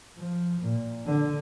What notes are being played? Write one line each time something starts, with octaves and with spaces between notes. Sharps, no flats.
F3
A#2
D3